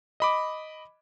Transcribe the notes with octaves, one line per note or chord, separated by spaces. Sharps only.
D#5 B5 D6